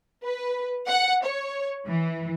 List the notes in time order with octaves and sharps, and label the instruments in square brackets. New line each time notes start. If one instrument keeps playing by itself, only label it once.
[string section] B4
F#5
C#5
E3